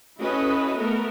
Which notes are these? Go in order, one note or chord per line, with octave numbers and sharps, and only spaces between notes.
C#4 E4 F#4 A4 B4 D#5
A3 B3 A4 A#4